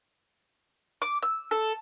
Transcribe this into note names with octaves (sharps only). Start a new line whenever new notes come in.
D6
E6
A4